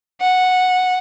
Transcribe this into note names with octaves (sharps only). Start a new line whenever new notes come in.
F#5